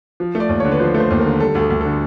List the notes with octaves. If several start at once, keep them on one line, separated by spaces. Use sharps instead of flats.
F3
A3
D5
D#2
D3 C#5
B4
F3 C5
A3
C5
D#2
A#4
D3
G3 A4
D2 A4
D2
D3 A4